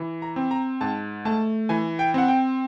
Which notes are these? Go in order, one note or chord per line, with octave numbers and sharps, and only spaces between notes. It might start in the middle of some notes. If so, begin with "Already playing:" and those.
Already playing: E3
A#5
C4
A#5
G#2 A5
A3 A5
E3 G#5
G5
C4 F#5
G5